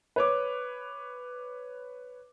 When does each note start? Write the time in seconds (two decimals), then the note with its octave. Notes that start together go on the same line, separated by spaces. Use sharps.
0.16 B4 C#5 D6